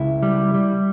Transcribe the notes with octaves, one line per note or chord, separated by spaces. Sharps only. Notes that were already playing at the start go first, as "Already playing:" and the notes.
Already playing: C#2 E4
G3
G3